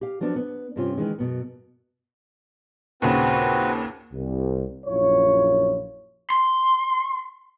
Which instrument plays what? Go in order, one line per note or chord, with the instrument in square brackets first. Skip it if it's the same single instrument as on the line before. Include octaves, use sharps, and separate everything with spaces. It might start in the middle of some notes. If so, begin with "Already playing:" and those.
[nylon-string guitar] G4 F5
F3 F#3 B3 D4
B3
G2 C3 C4 C#4 F4
D#3 E3 G#3
F#2 B2 B3
[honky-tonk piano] D#2 A#2 C#3 [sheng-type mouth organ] C4 F#4 B4
[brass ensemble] C2
A#1 F#2 E4 F4 C#5
[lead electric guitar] C6